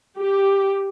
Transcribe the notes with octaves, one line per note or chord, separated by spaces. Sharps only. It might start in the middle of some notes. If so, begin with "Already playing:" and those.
G4